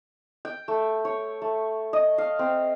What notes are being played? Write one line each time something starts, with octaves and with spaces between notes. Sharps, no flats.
G5
A3
C#5
A3
D#5
F5
C4